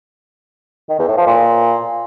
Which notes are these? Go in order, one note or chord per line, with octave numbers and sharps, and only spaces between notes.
D#3
E2
A2
F3
A#2